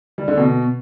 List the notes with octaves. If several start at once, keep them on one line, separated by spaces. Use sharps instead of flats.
G3
D3
B2